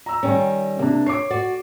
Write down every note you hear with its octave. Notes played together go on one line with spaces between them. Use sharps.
A#5 E6
D#3 G3 C#4
C3 A#3 D4
C#5 D6 C7
F#4 D5